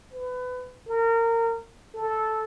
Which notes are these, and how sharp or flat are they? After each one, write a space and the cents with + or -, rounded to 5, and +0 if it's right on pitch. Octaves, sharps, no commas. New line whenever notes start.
B4 +25
A#4 -25
A4 -5